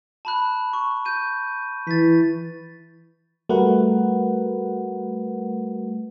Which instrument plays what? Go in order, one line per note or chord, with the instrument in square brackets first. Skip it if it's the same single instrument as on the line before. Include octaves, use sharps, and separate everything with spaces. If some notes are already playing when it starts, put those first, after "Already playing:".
[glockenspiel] A5 B5 F#6
C#6
G6 D#7
[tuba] E3 [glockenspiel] A6 B6
[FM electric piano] G3 A3 F#4 A#4 B4 F#5